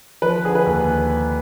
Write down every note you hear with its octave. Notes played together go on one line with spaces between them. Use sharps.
F3 B4
D3 G#4
B4
D#2